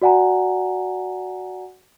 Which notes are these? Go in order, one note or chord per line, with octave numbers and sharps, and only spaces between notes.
F#4 D5 F#5 G#5 A#5